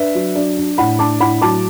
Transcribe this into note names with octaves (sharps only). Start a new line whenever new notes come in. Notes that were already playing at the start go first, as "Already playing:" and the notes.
Already playing: D4 B4 E5
F#3
D4 D5
D4
A2 F#5 B5
D4 A5 D6
A2 F#5 B5
F#3 A5 D6